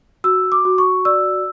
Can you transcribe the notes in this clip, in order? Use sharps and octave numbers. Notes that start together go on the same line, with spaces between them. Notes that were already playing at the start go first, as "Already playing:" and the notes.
F#4 E6
D6
F#4
C#6
D5 E6